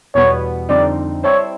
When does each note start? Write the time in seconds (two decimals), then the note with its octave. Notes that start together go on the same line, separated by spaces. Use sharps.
0.15 E2 B2 G3 B3 C#5
0.69 F2 D3 G3 C4 D#4 D5
1.23 G3 C4 E4 A4 C5 C#5